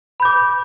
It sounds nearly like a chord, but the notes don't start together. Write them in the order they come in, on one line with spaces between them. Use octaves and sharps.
B5 G6 D6